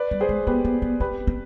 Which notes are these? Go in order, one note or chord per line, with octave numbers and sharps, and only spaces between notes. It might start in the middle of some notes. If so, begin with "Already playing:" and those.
Already playing: B4 D5
G3
G#4 C5
G#3
B3 G4 B4
B3
B3
C4 G4 B4
C4